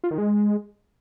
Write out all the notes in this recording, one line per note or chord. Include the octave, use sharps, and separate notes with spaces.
F4
D#3
G#3